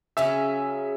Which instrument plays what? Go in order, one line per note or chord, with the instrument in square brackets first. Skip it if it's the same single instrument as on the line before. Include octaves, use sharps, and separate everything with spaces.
[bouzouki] C#3 F#3 C#4 G#4 [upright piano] E5